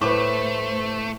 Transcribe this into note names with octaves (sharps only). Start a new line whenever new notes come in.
A2 A3 B4 C5 D6